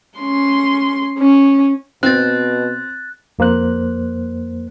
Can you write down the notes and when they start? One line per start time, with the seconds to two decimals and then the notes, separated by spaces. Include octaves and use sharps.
0.18 C#4 C6
1.18 C#4
2.03 B2 C4 F#6 A6
3.39 F2 A#3 C5 F#6